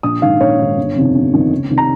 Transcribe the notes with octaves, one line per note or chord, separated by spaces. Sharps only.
A#1 D#6
G#2 D#3 F5
A#1 C#5
G#2 D#3
G1
F2 C3 D#3
G1
F2 C3 D#3
C#2
C3 D#3
A#5